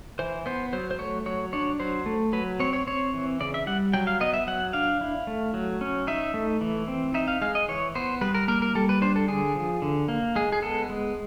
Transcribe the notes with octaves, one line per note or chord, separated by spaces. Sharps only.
E3 C5
B3 C5
F#3 C5
C5
A3 C#5
F#3 C#5
D4 C#5
F#3 C5
A3
F#3 B4
C4 C#5
C#5
C4 C#5
E3
C#3 D5
E5
G3 F#5
F#3 G5
F5
B3 D#5
E5
F#3 F#5
D4 F5
E4
A3
F#3
C#4
D#4 E5
A3
E3
C4
D#4 E5
F5
G#3 F5
D#5
E3 C#5
B3 C5
G3 B4
A#4
A#3 A#4
A#4
G3 A4
B4
D4 C5
A4
D3 G#4
F3
D3
A#3
G#3 G#4
G#4
B3 A4
G#3